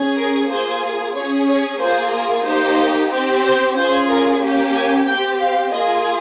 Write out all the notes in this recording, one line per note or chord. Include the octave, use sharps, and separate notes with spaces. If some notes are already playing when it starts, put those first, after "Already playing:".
Already playing: C#4 G#4
A#4
A#3 F4 G#4 C5
C#4 G#4 C#5
C#5
A#3 F4 G#4 C5
A#4
A#3 D#4 G4 C5
C4 G4
C5
C#4 F4 G#4 C5
A#4
A#3 C#4 G4
G#5
C4 G4 G5
F5
A#3 F4 G#4 D#5